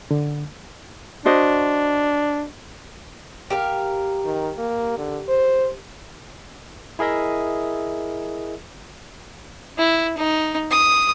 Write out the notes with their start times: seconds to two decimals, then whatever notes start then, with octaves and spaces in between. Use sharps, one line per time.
0.11 D3
1.25 D4 F#4 C5 D#5
3.50 G4 A#4 F5
4.25 D#3
4.58 A#3
4.98 D3
5.29 C5
6.99 E4 G#4 A#4 D#5 E5
9.78 E4
10.18 D#4
10.71 D#6